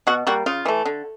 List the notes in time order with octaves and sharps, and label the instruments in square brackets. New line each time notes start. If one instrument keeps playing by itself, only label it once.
[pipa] B2 F#4
G3 A#3 F#4
C#3 F4
E3 A3
D3